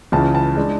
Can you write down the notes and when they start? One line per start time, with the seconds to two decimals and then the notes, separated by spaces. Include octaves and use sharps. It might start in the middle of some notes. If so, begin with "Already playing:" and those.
0.12 C#2 C#3 E3 A5
0.35 A5
0.57 G#3 D4